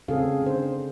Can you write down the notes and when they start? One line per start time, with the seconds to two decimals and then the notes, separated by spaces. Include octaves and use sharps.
0.08 C#3 C4 C#4 G#4 A4 F5
0.42 D3 C5